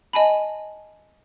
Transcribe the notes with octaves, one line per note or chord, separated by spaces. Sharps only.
D#5 G#5 A5 B5